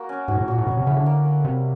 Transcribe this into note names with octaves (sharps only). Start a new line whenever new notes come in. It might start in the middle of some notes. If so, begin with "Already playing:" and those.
Already playing: A#3 F#4
C#4
G#2 F#4
A2
A#2 F#4
A2
B2 C#4
C3
C#3 E4
D3
A#3
A#3
C3 G3